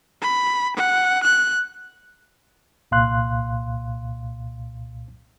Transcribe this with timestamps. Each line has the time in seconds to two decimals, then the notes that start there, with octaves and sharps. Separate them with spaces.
0.22 B5
0.76 F#5
1.23 F#6
2.91 C2 A#2 F5 C6 F#6